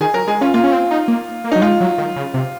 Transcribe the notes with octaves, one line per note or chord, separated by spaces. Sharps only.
D#3 G#4
F#3 A#4
G#3 G#4
C#4 F4
A#3 F4
C#4
C4
D#4
A#3
A#3
F#3 D#4
G#3 F4
F#3
D#3
C#3
C3